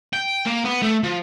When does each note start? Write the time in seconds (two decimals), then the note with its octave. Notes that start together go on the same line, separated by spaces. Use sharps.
0.13 G5
0.46 A#3
0.65 B3
0.82 A3
1.04 F3